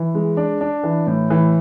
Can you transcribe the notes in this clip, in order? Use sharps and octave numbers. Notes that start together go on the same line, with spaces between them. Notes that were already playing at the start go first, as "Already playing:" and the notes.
Already playing: E3
G#3
D4
D4
E3
A2
E3